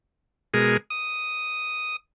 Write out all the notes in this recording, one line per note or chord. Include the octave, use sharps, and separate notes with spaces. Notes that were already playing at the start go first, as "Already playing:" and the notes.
B2 G#3 G#4 A#4
D#6